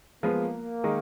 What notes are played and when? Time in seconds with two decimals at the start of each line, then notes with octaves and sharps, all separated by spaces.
0.23 F3 G#3 A#3 B3 F4
0.84 D#3 G#3 D#4